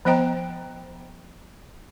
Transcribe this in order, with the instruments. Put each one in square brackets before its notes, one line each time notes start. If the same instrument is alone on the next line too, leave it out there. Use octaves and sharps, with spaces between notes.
[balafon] F3 B3 C5 D#5 G5 A#5